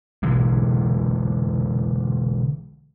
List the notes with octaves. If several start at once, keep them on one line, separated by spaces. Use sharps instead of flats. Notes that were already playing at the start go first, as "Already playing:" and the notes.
B2 D3 E3 G#3